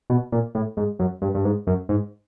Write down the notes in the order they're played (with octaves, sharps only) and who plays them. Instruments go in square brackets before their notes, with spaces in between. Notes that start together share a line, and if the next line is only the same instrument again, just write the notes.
[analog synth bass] B2
A#2
A2
G#2
F#2
G2
G2
G#2
F#2
G#2